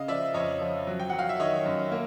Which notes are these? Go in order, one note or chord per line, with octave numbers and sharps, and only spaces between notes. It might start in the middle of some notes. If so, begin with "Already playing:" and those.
Already playing: C#3 D#5 F5
F3 D5 E5
F2 C#5 D#5
F3
F#3
G5
F#3 F#5
F5
E5
D#3 C#5 D#5
F#2
A#3